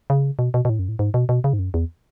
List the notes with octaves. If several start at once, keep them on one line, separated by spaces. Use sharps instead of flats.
C#3
B2
B2
B2
A2
F#2
A2
G#2
B2
B2
C#3
G#2
F#2
E2